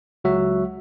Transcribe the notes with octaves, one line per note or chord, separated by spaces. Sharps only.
C#2 F#3 F#4 E5